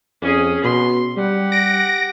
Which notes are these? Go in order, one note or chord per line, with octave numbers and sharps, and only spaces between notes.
F2 C#4 G#4
B2 C6
G3 G4 F#5
A#6 D7